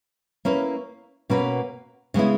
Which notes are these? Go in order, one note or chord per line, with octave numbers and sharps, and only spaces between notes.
A#3 C#4 E4 B4
B2 A#3 C#4 F#4 B4
C#3 G#3 B3 E4